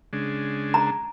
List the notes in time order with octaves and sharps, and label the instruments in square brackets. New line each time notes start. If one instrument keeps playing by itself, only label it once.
[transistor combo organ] C#3 G#3 D4
[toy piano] A#5